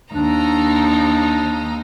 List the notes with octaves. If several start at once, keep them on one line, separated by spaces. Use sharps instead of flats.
D#2 D4 D#4 A#5